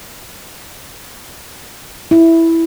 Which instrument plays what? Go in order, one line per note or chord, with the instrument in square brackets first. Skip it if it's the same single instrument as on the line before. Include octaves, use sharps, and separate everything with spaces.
[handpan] E4